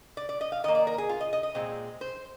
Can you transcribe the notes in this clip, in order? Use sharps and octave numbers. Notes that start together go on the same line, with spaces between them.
D5
D5
D#5
F5
D#3 A#3 D#5
D5
A#4
G#4
F4
D#5
D#5
D#5
A#2 G#3 C4
C5